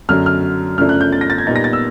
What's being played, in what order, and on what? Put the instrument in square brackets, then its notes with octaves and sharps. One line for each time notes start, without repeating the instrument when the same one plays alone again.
[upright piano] F#2 D3 F#3 F6
F6
F#2 C#3 F3 A3 D4 F6
F#6
G6
A6
A#6
A6
G#6
A#2 G3 B3 D#4 A6
A#6
A6
E6